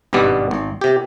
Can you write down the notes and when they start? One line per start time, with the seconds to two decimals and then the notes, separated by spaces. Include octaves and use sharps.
0.13 G#1 G2 B2 G3 B3 D5
0.51 G#1
0.81 C3 G4